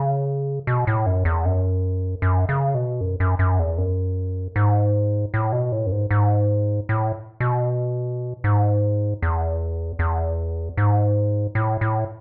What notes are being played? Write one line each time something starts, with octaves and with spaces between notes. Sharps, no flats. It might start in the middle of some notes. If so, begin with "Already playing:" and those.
Already playing: C#3
B2
A2
F#2
E2
F#2
F#2
C#3
B2
F#2
F#2
F#2
E2
F#2
G#2
A2
B2
A2
F#2
G#2
G#2
A2
B2
G#2
E2
E2
G#2
A2
A2